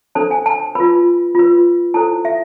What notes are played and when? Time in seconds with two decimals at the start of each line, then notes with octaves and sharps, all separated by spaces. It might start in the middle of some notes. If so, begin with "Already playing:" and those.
0.15 D4 A4 C5 A5
0.31 G#5
0.46 A5
0.75 F4 B4 B5
1.35 F4 B4
1.94 E4 A4 C5 A5
2.25 E5